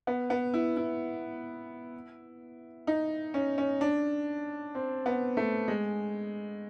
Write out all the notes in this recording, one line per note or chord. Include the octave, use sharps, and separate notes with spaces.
B3
B3
E4
E4
D#4
C#4
C#4
D4
C4
B3
A3
G#3